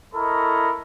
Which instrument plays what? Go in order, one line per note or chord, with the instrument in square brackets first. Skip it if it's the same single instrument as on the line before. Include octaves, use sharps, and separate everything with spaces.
[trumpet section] E4 A4 A#4 D#5 B5 C#6